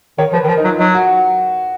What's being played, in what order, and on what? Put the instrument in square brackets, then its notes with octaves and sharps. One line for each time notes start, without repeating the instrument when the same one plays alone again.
[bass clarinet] D#3 [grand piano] C#5
[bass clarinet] F3 [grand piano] B4
[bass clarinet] D#3
[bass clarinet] F3 [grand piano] A#4
[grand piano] D#4
[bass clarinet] F#3 [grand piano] F4
[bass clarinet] F#3 [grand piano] D#4
[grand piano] F#4